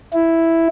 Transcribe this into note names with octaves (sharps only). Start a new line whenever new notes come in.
E4